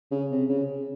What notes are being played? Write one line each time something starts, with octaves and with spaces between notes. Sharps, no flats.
C#3
C3
C#3